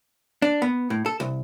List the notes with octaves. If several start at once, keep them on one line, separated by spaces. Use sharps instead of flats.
D4
B3
A2
A4
C2